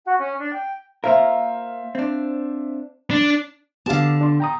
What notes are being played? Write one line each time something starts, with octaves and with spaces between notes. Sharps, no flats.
F#4
C#4
D4
G5
A#3 F4 A#4 C5 E5 F5
C4 D4
D4
D3 B3 G4 F5 A5
D4 C6
G5 A#5 D#6